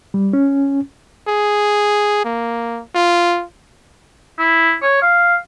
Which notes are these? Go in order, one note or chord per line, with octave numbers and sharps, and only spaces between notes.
G3
C#4
G#4
A#3
F4
E4
C#5
F5